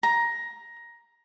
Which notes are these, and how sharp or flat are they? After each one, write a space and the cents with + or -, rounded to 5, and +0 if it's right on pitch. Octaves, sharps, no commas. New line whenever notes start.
A#5 +15